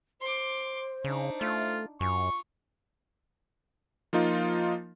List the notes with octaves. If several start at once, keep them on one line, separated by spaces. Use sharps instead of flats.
C5 C6 D6
C#3 D4 D#4
A3 F4
F#2 F4 G#5 C#6
F3 A#3 D#4 F4